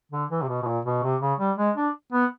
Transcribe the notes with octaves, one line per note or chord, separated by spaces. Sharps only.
D3
E3
C3
B2
B2
A#2
B2
C3
C#3
G3
G#3
D4
B3